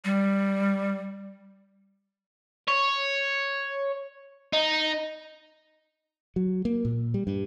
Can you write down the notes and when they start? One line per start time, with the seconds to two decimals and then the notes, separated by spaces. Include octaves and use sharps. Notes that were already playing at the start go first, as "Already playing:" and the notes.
0.05 G3
2.68 C#5
4.53 D#4
6.36 F#3
6.65 A#3
6.85 A#2
7.14 G3
7.27 G2